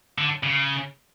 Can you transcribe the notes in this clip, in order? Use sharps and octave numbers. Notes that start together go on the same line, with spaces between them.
D3
C#3